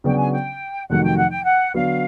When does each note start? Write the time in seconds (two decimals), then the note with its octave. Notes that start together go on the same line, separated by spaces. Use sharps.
0.04 C#3 F#3 B3 D4 F#4 G5
0.17 G#5
0.31 G5
0.89 F2 C3 D#3 F#3 A3 F#5
1.03 G5
1.16 F#5
1.30 G5
1.44 F#5
1.74 D3 F#3 B3 F5